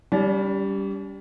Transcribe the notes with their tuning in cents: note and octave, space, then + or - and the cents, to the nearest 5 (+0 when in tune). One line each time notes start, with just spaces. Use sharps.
G3 +0 C#4 +45